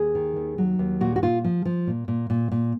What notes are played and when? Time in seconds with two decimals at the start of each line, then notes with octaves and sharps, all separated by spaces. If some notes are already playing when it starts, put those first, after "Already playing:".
Already playing: D#2 G#4
0.15 D#3
0.36 D#2
0.58 F#3
0.79 D#2
1.01 A#2 F#4
1.16 F#4
1.22 A#2 F4
1.44 F3
1.65 F3
1.87 A#2
2.08 A#2
2.30 A#2
2.52 A#2